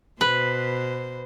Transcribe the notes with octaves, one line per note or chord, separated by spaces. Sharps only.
B2 B4 C5